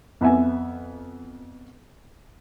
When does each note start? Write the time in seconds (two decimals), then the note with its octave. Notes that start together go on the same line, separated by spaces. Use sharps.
0.21 F2 B3 E5 G#5